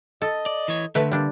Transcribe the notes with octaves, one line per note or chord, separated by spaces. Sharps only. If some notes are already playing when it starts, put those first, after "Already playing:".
A4 D#5
D5
E3 C#5
D3 A3 B4 E5
G3 A#3 D4